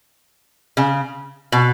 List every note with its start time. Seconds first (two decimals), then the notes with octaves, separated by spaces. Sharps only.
0.77 C#3
1.52 B2